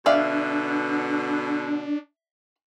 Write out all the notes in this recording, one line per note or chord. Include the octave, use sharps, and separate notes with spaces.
B2 D3 D4 D5 E5 F5